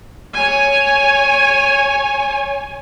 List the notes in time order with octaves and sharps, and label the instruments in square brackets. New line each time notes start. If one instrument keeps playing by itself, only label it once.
[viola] C#5 G#5